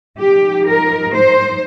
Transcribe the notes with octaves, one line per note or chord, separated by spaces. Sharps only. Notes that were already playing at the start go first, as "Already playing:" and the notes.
F3 D#4 G4
A#4
C5